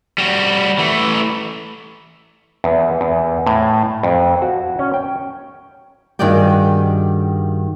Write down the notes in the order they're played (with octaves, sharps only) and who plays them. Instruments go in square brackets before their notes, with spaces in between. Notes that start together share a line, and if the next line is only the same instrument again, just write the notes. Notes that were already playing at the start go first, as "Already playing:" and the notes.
[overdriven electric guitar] G3 F#4
E3 A3
[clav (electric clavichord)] E2
E2
A2
F2
F#4
C#4
G5
[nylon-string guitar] G2 D#3 F#4 G#4 D5 G5